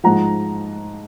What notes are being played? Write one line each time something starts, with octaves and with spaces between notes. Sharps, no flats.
G#2 F3 F#5 A#5